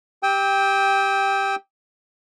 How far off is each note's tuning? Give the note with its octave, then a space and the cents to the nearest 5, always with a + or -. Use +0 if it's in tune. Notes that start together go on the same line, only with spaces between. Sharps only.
G4 +0 G5 +5 E6 -45